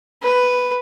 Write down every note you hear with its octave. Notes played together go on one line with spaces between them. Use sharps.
B4